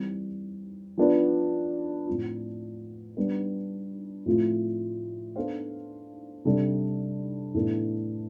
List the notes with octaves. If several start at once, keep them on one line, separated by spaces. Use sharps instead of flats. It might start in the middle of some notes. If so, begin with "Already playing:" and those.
Already playing: E3 G3 C4
F3 B3 D4
A2 F3 C4 F4
G3 B3 D4
A2 F3 A3 C4 F4
B3 D4 A4 C5 F5
C3 G3 D4 A4
A2 E3 B3 D4 A4